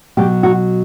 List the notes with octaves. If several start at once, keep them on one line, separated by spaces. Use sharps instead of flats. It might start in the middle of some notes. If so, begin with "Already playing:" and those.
B2 F#3 G4
F#4